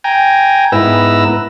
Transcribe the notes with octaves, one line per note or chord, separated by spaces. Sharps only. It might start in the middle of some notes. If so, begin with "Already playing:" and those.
G5 G#5 A#5
G#2 B3 E4 B4 A#5 E6